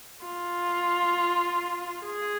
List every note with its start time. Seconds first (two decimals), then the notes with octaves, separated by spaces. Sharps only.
0.25 F4
2.05 G#4